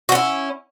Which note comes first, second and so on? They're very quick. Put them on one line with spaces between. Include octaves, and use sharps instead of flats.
F#4 C#4 E4